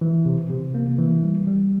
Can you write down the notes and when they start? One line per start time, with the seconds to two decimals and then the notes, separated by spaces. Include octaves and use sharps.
0.01 E3
0.25 C3
0.50 C3
0.74 A#3
0.98 E3
1.23 G3
1.47 G3